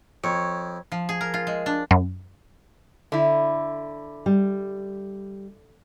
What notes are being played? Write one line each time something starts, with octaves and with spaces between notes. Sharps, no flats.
F2 C#5
F3
G#4
A#4
F4
G#3
D4
F#2
D3 E4
G3